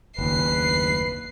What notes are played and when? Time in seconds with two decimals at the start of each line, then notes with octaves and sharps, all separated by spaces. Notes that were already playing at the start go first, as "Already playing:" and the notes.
0.18 F#1 D#2 B4 C7